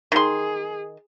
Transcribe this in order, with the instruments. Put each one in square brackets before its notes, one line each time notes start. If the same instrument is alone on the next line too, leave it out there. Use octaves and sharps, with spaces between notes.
[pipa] D#3 C6 [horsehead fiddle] G#4